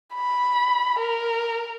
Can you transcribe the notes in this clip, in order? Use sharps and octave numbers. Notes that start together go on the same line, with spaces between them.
B5
A#4